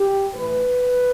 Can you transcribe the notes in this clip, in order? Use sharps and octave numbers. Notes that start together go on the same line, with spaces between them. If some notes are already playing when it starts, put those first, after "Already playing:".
Already playing: G4
A2 E3 B4